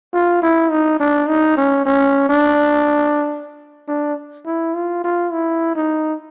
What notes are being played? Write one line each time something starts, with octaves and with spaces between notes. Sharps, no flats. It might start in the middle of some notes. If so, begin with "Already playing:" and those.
F4
E4
D#4
D4
D#4
C#4
C#4
D4
D4
E4
F4
F4
E4
D#4